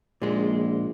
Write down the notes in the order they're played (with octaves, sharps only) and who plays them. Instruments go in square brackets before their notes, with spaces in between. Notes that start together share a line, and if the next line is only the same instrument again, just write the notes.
[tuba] A#1 [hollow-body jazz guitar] A#2 G#3